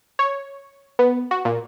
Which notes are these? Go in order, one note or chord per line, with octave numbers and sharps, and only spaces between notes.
C#5
B3
F#4
A#2